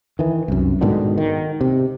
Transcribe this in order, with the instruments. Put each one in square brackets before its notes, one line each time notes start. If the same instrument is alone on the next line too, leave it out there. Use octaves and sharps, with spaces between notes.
[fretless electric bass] D#3 E3
C2 F#2
G#2 B2 D3 D#3
D#3
C3